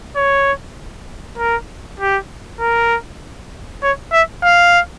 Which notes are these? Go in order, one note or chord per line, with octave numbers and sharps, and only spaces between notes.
C#5
A#4
G4
A#4
C#5
E5
F5